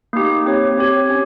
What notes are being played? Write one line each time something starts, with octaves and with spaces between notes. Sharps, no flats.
A#3 D#4 G4
C4 G4 C#5
C4 G4 C#5
C#4 G4